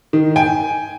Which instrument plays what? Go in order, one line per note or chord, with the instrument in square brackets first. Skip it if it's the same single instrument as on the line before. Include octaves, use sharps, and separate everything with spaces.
[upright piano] D#3
G5 G#5